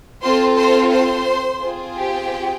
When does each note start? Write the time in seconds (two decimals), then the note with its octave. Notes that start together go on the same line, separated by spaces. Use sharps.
0.22 C4 F4 A4 C5 C6
0.57 C5 C6
0.92 C5 C6
1.62 C4 F4 G#4
1.96 G4 G5